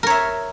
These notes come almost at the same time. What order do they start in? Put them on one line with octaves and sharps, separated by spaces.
A#4 C#5 E5